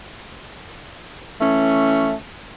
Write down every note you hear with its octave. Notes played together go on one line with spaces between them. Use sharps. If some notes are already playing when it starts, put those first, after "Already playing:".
E3 A3 C#4